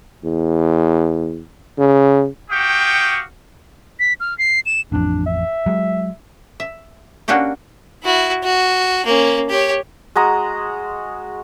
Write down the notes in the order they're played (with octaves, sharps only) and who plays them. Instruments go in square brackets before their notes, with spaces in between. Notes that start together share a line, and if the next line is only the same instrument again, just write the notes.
[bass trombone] E2
C#3
[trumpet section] F#4 G4 F5 G5 C#6 D#6
[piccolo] B6
F6
C7
E7
[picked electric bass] A1 F2 [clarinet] D4
[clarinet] E5
[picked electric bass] F#3 G#3
[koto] E5
A#3 C#4 D4 F#4 G4 A4
[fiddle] E4 F#4
F#4
A#3 C#4
G4 C#5
[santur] G#3 F#4 A#5 D#6